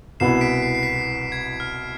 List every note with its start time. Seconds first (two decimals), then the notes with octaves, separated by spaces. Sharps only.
0.20 C2 B2 B3 E4 C7 E7
0.41 B6 D7
0.62 C7
0.75 C7
0.83 B6
1.32 G#6
1.60 F6